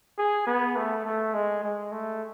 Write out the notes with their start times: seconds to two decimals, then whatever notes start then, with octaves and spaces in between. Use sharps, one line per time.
0.18 G#4
0.47 B3
0.76 A3
1.05 A3
1.34 G#3
1.63 G#3
1.92 A3